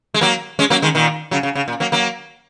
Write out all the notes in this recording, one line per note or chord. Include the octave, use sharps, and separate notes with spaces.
G#3
F#3 A#3
G#3 C#4
F#3 A#3
D#3 G#3
A#2 D#3
C#3 F#3
C#3
C#3
A#2
F#3 A#3
F#3 A#3